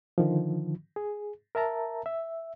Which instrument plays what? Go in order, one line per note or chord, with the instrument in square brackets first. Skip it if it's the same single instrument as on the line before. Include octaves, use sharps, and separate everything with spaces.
[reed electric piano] D3 D#3 F3
G#4
A#4 E5 A5 A#5
E5